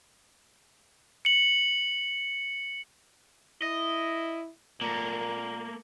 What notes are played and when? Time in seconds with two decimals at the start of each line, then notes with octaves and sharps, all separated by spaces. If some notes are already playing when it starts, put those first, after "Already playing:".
1.25 C#7 F#7
3.62 E4 D#5
4.81 A#2 A3 A#3